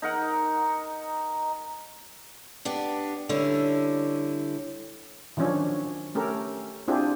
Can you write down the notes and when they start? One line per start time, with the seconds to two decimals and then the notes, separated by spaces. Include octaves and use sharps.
0.02 D#4 A#4 F#5
2.65 B3 D4 G4
3.29 D3 G3 C#4 E4
5.37 D#3 F3 F#3 C#4 D4 C#5
6.15 A3 C#4 G4 A4 A#4
6.88 C4 D4 E4 F4 G4 G#4